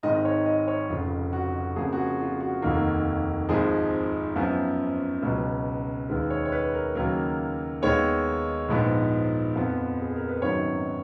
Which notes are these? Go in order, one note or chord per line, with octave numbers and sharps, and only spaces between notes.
G#1 G#2 D#3 D#5
C#5
D#5
C#5
F1 F2 C#3 F4
F#4
F2 C#3 F3 A#3 G#4
F#4
G#4
F4
F#4
F1 D#2 D#3 A#3
G#1 G#2 F3 G#4
F#2 F3 B3
C#2 B2 F#3
D#2 D#3 G#3 B4
C#5
C#5
B4
A#4
D#2 C#3 F#3 A#3 A#4
D#2 D#3 G#3 B3 C#5
A#1 G#2 F3 B3
F2 F3 B3
G#4
A#4
B4
G#1 F#2 D#3 F#3 B3 C#5